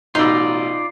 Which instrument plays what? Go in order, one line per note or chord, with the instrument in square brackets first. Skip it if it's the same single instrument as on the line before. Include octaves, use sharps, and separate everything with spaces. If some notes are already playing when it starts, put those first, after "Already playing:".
[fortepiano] A1 B2 E6 [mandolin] D#4 [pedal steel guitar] F4 D5